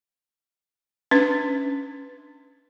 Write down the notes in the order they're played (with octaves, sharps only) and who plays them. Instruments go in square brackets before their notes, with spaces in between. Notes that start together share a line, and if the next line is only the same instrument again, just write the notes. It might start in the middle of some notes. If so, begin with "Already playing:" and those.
[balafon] C#4 D4 B4